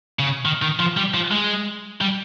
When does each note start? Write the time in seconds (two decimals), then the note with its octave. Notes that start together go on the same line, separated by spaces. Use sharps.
0.19 C#3
0.45 D#3
0.62 D#3
0.80 F3
0.97 G3
1.14 F3
1.32 G#3
2.01 G3